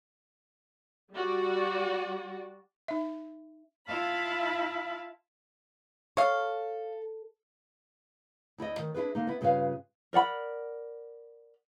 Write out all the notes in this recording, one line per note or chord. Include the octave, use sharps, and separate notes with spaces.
G3 F#4 D5
D#4 E5
E4 F4 E5 F5 A5 B5
A4 C#5 F5
D2 E4 D5 D#5
D#3
D4 E4 F4 G#4 B4
D3 A#3 D#4
B3 E4
G2 C#3 F4 G#4 B4 F5
A#4 D5 F#5 B5